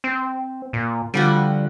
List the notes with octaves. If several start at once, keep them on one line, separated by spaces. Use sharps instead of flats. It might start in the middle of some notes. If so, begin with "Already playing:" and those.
C4
A#2
D3 F3 G3 F#4